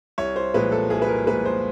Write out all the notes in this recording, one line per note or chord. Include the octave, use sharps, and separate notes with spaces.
C2 C#5
C5
A#2 F3 G#3 B4
A4
C2 G#4
B4
A#4
A#2 F3 G#3 B4
C5